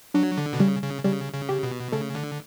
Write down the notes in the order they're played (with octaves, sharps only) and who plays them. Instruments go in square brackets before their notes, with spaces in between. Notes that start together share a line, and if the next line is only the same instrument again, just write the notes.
[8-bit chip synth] F#3 [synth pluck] D4
[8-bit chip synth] D3
B2
[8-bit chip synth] C#3 [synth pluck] G3
[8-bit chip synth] C#3
[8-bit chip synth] C#3 [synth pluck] G3
[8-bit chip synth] C#3
[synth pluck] G4
[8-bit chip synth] B2
[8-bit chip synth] C#3 [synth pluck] A3
[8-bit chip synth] D3